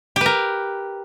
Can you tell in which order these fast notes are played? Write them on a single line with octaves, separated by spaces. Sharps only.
G4 B4 A#4